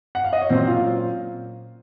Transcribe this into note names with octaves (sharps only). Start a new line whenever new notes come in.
F#5
F5
D#5
C#5
A#2 F#3 C4 C#4 C5
F4 F5